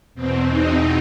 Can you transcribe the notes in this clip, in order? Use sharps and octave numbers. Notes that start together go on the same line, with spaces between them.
E2 B2 C4
D#4